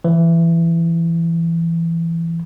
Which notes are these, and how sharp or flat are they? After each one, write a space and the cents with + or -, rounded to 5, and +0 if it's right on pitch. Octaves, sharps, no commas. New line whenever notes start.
E3 +20